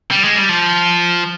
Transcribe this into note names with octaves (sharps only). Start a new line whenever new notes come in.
G3
G#3
G3
F3